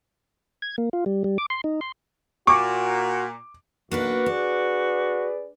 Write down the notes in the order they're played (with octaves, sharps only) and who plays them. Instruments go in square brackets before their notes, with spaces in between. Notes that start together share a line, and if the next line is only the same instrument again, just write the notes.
[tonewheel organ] G#6
A#3
F4
G3
G3
D6
C6
D#4
C6
[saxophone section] A#2 [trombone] F#4 [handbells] C#6 [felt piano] D6
[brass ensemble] B1 [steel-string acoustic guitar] A#3 D4 B4 [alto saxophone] F#4
[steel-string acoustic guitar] D4 [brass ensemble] G#4 B4 D5